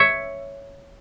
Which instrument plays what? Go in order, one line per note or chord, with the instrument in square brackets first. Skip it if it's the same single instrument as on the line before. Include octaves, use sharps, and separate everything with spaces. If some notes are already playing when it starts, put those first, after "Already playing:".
Already playing: [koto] C#5 E5